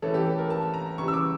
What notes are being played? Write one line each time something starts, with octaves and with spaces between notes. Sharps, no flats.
E3 A3 C#4 A4
G4
A4
A#4
A5
A#5
C#3 E3 G3 C#6
E6
D6